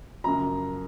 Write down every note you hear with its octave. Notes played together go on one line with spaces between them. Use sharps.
F#2 C#3 F3 A#5